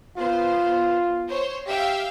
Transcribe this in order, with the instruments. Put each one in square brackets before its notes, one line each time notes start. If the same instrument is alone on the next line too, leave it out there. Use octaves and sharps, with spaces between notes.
[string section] B3 C5 [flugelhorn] F4
[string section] C5 C#5
[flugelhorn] G4 [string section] E5 F5 G5